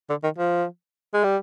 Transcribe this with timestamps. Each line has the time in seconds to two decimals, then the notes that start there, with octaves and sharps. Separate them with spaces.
0.09 D3
0.23 D#3
0.38 F3
1.14 G#3
1.24 G3